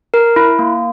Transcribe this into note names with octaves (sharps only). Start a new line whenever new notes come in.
A#4
E4
A#3